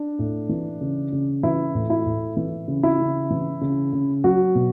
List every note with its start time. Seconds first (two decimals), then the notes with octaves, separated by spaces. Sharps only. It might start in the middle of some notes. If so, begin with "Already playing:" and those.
Already playing: D4
0.19 A2
0.49 E3
0.81 C#3
1.12 C#3
1.43 E3 E4
1.75 A2
1.90 E4
2.06 A2
2.37 E3
2.68 C#3
2.83 E4
3.00 C#3
3.31 E3
3.61 C#3
3.93 C#3
4.24 F#3 F#4
4.55 B2